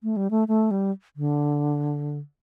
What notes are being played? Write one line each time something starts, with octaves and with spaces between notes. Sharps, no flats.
A3
G3
A3
A3
G3
D3